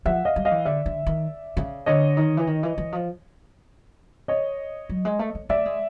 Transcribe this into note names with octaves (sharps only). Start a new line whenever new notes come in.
F3 E5 F#5
D#5 F5
G3
D#5 F5
E3
D3 D5 E5
D3
D#3
C#3
D3 C#5 D#5
D#3
E3
D#3
E3
E3
F3
C#5 D#5
F#3
G#3
A3
A3
A3 D5 E5
G#3